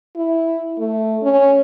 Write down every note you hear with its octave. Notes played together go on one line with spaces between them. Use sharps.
E4
A3
C#4